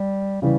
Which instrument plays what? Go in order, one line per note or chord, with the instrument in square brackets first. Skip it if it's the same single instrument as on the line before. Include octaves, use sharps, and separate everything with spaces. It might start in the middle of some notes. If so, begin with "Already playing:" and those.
Already playing: [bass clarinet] G3
[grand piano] C#3 E3 [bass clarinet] G3